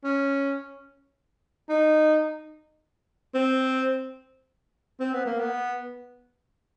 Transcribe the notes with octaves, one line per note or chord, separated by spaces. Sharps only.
C#4
D#4
C4
C4
B3
A#3
B3